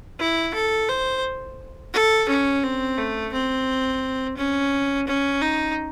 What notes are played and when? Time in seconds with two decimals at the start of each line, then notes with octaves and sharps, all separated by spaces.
0.19 E4
0.54 A4
0.89 C5
1.94 A4
2.29 C#4
2.64 C4
2.98 A3
3.33 C4
4.38 C#4
5.07 C#4
5.42 D#4